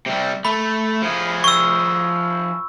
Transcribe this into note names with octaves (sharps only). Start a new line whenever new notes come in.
C3 G3
A3 B5
F3 G#4
C#6 E6